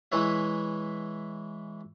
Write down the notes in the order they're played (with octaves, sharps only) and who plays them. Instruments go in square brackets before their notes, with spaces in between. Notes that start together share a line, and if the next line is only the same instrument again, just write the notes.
[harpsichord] E3 G#3 E4 B4 C#5 E5